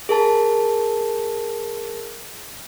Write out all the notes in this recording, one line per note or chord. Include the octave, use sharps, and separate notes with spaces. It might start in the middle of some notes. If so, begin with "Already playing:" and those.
G#4 A#4 A5